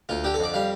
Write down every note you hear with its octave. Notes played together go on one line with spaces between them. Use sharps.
D2 F4
D3 G4
A4
F2 D5
G3 F5